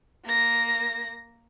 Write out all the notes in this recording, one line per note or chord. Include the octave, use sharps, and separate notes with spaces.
A#3 A#6